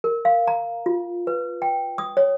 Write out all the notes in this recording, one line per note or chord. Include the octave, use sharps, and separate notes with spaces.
A#4
F5
A#5
F4
B4
G5
D#6
C#5